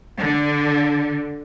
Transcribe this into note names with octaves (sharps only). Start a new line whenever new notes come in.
D3